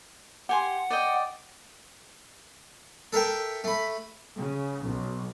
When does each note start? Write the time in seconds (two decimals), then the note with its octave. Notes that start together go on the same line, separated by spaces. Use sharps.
0.49 G4 F#5 G#5 C6
0.90 D5 D#5 G5
3.13 A4 A#4 E5 G5
3.64 A3 B5
4.37 C#3
4.82 B1